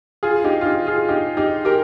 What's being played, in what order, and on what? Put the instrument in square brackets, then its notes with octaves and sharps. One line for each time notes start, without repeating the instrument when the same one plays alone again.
[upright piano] F4 G#4
D#4 G4
F4
D#4 G4
F4 G#4
D#4 G4
D#4 G4
G4 A#4